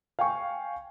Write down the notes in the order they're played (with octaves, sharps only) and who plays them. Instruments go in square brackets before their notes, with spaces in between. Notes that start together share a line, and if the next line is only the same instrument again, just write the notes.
[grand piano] F5 G5 G#5 C#6